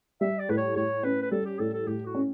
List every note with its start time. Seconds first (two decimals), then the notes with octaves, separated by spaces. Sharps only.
0.21 G3 E5
0.39 D5
0.49 A2 B4
0.57 C#5
0.76 A2 C#5
1.03 C#4 B4
1.22 B4
1.31 G3 A4
1.45 G4
1.59 A2 A4
1.73 A4
1.87 A2 G4
2.06 F#4
2.15 C#4